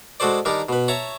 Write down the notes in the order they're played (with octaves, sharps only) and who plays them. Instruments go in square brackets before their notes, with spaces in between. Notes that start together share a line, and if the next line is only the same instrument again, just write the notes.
[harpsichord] G#3 F#4 A4 C5 D5
D#3 G3 D4 D#4 A#4
B2 B4
C#5 E5 A5 A#5 C#6